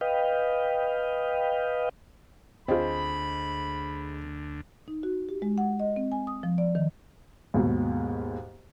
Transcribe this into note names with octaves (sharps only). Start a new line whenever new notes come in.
B4 D#5 F5 G5
D2 C4 F4 G#4 C5 D#5 B5
D#4
F#4
G4
G#3
F#5
D#5
C4
G#5
D#6
F3
D5
D#3
D#2 G#2 B2